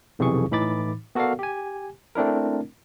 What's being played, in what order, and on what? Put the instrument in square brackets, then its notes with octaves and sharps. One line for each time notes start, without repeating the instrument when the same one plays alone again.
[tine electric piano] B1 F2 C3 E3 G#4 C#6
A2 E3 D#4 B5 D6 A6
B3 F#4 A4 A#4 D5 F5
G4 G#5
A3 C4 D4 E4 A#4